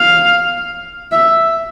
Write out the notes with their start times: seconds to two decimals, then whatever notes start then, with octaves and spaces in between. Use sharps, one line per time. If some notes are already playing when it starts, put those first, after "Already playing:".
Already playing: F5
1.12 E5